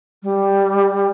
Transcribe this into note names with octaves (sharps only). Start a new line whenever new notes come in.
G3